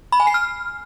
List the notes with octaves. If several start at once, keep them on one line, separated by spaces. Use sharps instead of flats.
B5
G#5
C7
F6